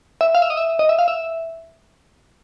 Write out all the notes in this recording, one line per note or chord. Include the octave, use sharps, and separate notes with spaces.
E5
F5
E5
D#5
E5
D#5
E5
F5
E5